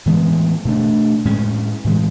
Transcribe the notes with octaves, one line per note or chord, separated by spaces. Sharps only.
A2 E3 G#3 B3
B2 A3 D4
A2 G#3 C#4
A2 E3 G#3